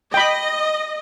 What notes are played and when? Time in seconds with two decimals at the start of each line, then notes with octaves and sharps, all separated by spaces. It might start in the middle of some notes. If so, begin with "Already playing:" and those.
0.14 D#5 G5 B5